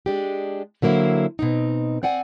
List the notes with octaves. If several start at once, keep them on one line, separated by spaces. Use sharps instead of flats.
G#3 D4 G4
D3 F#3 A#3 C4 E4 C5
B2 C4 D#4
C4 D5 F#5 G#5